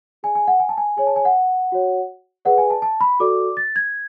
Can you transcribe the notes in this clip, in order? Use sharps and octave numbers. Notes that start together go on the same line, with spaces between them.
G#4 D5 G#5
G#5
F#5
G#5
A5
G#5
G#4 C#5 G#5
A5
G#5
F#5
F#4 C#5
G#4 B4 D5 F#5
G#5
A5
A5
B5
F#4 A4 D5 D6
A6
G#6